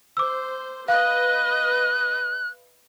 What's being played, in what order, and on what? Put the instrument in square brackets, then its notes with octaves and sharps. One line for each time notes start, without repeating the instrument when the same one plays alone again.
[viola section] C5 [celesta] D6 E6
[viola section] B4 D#5 [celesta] F5 [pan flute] F#6